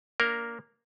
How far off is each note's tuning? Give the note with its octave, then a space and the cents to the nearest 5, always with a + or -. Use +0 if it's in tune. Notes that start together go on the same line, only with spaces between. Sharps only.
A#3 +0 D4 -25 A#4 +0